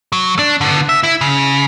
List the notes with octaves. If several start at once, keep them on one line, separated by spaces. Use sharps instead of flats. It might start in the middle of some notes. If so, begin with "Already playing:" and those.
F#3
D4
D3 B3
E5
E4
C#3